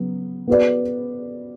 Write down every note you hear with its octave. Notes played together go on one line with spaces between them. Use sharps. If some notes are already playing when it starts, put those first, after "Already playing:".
Already playing: C#3 F#3 B3
B3 F#4 B4 D5